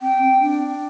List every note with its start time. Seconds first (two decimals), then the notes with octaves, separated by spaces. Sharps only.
0.01 C4 G5
0.22 C4
0.42 D4